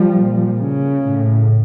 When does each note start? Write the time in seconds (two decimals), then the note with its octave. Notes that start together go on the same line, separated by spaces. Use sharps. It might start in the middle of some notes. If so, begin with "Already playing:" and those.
Already playing: F3 G3
0.14 A#2
0.58 C#3
1.01 A2